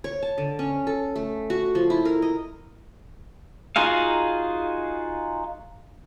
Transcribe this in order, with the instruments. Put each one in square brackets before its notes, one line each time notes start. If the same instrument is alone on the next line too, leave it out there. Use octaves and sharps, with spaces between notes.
[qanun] C#5
A5
D3
C#4
A4
A3
F#4
F3
E4
A#4
D#5
[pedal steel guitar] D#4 F4 F#4 G#4 F5